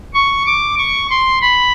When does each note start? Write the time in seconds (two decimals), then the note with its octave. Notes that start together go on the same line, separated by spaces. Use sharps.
0.14 C#6
0.46 D6
0.78 C#6
1.10 C6
1.41 B5